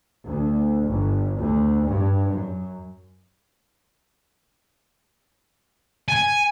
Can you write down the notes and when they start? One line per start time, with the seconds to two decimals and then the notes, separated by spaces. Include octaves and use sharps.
0.24 D2
0.86 G1
1.36 D2
1.85 G2
2.31 F#2
6.09 G#5